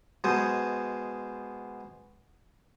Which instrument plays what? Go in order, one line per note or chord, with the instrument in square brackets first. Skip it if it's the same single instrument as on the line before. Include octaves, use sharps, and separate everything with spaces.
[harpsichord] B2 G#3 C5 A5 C6 D#6